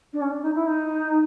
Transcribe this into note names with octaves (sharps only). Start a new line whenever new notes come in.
D4
C#4
D4
D#4
E4
D#4